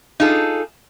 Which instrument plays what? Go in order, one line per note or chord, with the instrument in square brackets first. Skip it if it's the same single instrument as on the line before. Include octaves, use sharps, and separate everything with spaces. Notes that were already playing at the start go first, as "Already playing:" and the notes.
[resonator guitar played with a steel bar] D#4 F4 G#4 A4